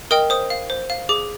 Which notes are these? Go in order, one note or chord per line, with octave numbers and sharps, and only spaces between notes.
A#4 D#5 G5 D#6
C5 D#6
F5
C5
F5
G#4 D6